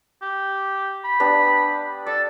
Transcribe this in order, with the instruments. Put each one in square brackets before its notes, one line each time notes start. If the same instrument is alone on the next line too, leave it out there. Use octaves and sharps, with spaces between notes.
[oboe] G4
B5
[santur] B3 D4 G4
[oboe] A4 [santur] D5